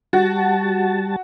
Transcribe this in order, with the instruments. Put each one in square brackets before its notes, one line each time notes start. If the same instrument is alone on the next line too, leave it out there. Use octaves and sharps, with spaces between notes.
[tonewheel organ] G3 A5 [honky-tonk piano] F#4